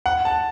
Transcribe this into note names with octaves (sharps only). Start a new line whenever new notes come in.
F#5
A5